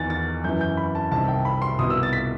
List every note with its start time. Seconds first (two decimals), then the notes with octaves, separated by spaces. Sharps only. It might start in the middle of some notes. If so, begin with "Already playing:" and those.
Already playing: E2 D#3 A6
0.10 A6
0.44 F#2 E3 G6
0.61 G6
0.77 B5
0.95 A5
1.11 C2 C3 D#3 A5
1.28 G5
1.45 B5
1.62 C6
1.79 C2 B2 D#6
1.90 E6
2.03 A6
2.13 B6